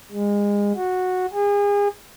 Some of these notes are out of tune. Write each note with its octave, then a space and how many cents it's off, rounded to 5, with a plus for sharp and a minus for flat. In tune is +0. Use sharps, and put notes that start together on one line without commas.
G#3 -30
F#4 -10
G#4 -35